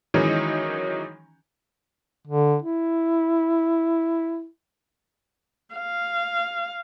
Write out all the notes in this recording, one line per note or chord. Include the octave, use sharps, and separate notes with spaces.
D#3 E3 F#3 G#3 C#4 D#4
D3
E4
F5